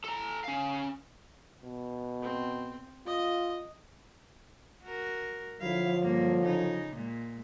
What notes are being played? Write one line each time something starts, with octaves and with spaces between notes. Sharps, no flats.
A4 A#5
C#4 F5
B2
C4
F4 D#5
F#4 A#4
D3 F3 F#3 E4 F5
G2 A#3
C#3 D#4
A#2 G#3